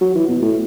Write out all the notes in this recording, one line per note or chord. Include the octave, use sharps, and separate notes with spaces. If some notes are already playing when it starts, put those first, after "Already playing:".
F#3
E3
B2
A2